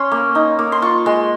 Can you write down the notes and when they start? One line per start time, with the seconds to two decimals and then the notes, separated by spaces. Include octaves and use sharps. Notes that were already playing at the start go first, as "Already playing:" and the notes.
Already playing: C#4 C6
0.11 A#3
0.35 D#4
0.59 A#3
0.72 C6
0.82 F4 C#6
1.06 G#3 C6